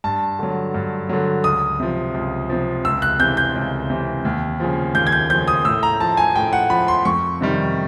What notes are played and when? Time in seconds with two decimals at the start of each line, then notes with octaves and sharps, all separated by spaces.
0.04 G2 A5
0.39 D3 F#3
0.74 G2
1.09 D3 F#3
1.44 C#2 D#6
1.80 C3 F3
2.14 C#2
2.49 C3 F3
2.84 C#2 E6
3.02 F#6
3.20 C3 E3 G6
3.37 G6
3.55 C#2
3.90 C3 E3
4.25 D#2
4.60 C#3 F3
4.95 D#2 G6
5.07 G#6
5.12 G6
5.30 C#3 F3 G6
5.48 D#6
5.65 A2 E6
5.83 A#5
6.00 F3 A5
6.17 G#5
6.35 A2 G5
6.53 F#5
6.70 F3 B5
6.88 C6
7.05 F2 C#6
7.41 C3 D#3 G3